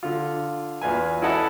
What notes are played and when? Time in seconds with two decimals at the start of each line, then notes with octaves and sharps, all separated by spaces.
0.03 D3 F4
0.82 E2 F4 B4 G#5
1.22 C#4 E4 A4 D#5 F#5 A5